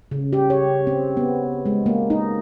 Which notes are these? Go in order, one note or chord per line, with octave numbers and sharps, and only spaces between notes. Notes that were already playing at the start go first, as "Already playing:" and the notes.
C#3
G4
C#5
C4
B3
G#3
A#3
D#4